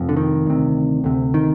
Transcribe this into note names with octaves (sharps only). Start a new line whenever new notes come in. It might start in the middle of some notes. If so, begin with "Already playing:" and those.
Already playing: F1 F2
D3
D#3
D2 C3
D2 C3
D#3